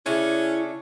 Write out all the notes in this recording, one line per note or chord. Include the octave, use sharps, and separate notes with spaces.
C#3 A3 C#4 D4 E4